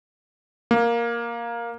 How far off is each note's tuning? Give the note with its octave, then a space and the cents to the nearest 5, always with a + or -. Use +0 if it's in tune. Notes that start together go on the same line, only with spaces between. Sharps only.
A#3 +5